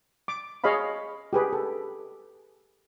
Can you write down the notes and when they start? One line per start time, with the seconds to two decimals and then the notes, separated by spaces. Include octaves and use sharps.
0.28 D6
0.64 G#4 C#5 D#5 F5 B5
1.33 G4 G#4 B4
1.53 A4